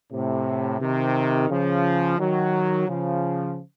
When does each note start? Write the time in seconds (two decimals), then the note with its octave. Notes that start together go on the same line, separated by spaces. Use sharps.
0.13 A2 C3
0.81 C3 D#3
1.50 C#3 F3
2.19 D#3 F#3
2.88 C#3 F3